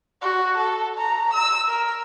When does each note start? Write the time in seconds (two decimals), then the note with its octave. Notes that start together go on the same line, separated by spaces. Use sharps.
0.22 F#4
0.57 A4
0.98 A#5
1.33 E6
1.68 A#4